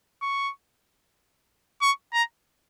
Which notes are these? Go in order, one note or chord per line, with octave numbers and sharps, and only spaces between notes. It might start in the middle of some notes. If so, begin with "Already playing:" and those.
C#6
C#6
A#5